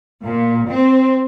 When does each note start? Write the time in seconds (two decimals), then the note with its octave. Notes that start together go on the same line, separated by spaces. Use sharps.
0.22 A#2
0.68 C4